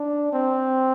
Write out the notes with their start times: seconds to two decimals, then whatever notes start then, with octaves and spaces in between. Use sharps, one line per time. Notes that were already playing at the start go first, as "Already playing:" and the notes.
Already playing: D4
0.33 C4